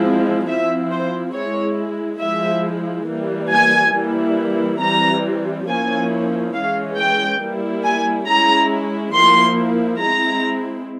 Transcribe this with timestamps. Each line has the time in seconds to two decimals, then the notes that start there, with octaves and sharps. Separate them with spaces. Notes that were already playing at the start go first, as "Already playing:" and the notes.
Already playing: F3 G#3 C4 E4
0.48 F3 C4 E4 E5
0.91 C5
1.34 G#3 E4 C#5
2.21 F3 G#3 E4 E5
3.07 E3 G3 A#3
3.51 G#5
3.95 E3 G3 A#3 E4
4.81 E3 G3 C4 A#5
5.68 F3 A#3 C#4 E4 G#5
6.55 E3 G#3 C#4 F5
6.98 G5
7.42 G3 A#3 E4
7.84 G#5
8.28 G#3 C#4 E4 A#5
9.14 F3 A#3 E4 C6
10.01 G#3 C4 E4 A#5